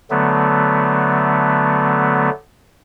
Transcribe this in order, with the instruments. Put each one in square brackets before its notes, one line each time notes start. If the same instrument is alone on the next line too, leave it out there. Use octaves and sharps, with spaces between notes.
[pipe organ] D3 F#3 A3 B3